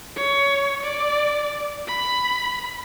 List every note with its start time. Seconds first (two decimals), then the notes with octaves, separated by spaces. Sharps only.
0.16 C#5
0.83 D5
1.87 B5